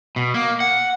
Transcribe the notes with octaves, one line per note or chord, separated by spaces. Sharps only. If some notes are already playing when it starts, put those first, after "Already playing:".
B2
A#3
F#5